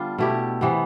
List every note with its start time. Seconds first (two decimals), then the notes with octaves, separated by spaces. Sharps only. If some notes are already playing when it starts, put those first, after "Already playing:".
Already playing: D3 G3 B3 D4 F4
0.18 B2 A3 E4 G4
0.61 C3 E3 B3